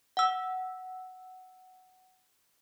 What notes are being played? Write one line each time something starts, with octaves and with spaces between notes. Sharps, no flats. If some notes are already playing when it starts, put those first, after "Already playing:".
F#5 E6